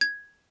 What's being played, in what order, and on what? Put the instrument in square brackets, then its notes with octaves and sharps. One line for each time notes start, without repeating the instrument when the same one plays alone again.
[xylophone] G#6